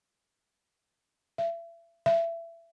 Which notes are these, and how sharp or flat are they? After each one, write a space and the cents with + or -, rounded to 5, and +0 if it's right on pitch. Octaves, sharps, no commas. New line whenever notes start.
E5 +35
E5 +25